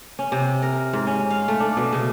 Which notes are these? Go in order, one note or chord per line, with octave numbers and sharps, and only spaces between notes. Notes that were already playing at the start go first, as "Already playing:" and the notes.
C#4
C3
A#4
G#2
C#4
F5
A3
D4
B2
C#3